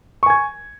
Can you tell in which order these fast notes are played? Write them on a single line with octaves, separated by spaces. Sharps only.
C#6 G#5 G#6